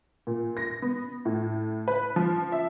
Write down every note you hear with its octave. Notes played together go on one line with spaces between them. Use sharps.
A#2
A#6
B3
A2
B4
F3
E5